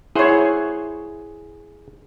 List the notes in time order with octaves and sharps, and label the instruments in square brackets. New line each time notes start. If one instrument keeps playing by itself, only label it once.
[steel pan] E4 C#5 [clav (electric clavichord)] G#4 C5 F#5